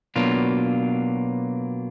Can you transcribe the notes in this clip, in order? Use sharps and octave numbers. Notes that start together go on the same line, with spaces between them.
B2 F#3 A#3 D4 F4